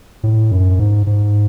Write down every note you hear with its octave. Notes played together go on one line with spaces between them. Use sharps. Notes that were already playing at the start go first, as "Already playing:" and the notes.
A2
F#2
G#2
G#2